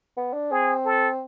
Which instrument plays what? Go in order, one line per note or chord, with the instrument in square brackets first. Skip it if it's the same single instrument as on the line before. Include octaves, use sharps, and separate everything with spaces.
[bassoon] B3
D4
[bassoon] C4 [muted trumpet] G#4
[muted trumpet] A4